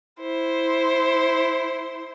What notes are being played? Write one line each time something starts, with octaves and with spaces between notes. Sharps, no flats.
E4 C5